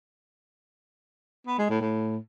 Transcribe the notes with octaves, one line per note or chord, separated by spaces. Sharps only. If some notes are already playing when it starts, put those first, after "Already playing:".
B3
G#3
A2
A2